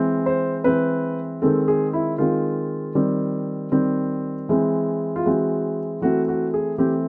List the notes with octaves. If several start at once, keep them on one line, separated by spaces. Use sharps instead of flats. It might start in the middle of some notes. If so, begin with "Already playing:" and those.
Already playing: E3 G#3 C4
C5
E3 G#3 C4 B4
D#3 G#3 C4 A4
G#4
E4
D#3 G#3 C4 F4
D#3 G3 C4
D#3 G3 C4
E3 G#3 C4
F4
E3 G#3 C4 F#4
E3 A3 C4 F#4
F#4
G#4
E3 A3 C4 G4